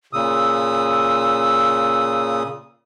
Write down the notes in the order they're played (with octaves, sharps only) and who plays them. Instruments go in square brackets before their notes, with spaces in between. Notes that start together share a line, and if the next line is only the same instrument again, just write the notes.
[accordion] A#2 C#3 D#6 [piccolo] E6